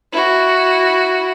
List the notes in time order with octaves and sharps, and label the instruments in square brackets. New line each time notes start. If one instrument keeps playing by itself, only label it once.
[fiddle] E4 F#4